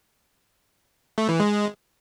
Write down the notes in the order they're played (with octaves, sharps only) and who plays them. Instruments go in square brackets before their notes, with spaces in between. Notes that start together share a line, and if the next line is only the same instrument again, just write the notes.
[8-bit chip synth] A3
E3
G#3